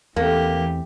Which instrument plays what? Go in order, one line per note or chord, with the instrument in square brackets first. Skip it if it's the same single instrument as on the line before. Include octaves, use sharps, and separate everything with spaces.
[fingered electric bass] E2 C4 [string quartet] E3 G4 [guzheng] A3 [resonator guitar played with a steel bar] A#3